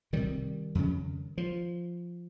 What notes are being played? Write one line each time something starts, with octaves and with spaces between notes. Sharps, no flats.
C2 C3 D#3 G3
F2 C#3
F3